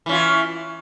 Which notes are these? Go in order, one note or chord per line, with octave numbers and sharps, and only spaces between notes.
E3 C#4 F4